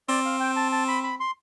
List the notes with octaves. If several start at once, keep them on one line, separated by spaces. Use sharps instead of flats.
C4 D5
F5
G5
A5
A5
B5
B5
C6